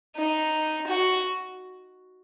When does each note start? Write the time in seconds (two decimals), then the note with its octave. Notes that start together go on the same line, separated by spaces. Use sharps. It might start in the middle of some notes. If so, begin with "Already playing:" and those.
0.16 D#4
0.87 F#4